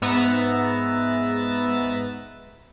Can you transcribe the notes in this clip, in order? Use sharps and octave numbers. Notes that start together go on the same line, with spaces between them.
G#2 B3 E5 A#5 A6